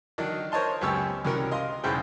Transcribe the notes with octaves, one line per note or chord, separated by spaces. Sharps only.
D3 D#3 F#3 D4 D#4
A#4 C5 C#5 D#5 A5 C6
C#2 F#2 B3 G4 C#6 E6
C2 C#4 F#4 A#4
D#5 F5 C6
B1 E2 C#3 C5 G5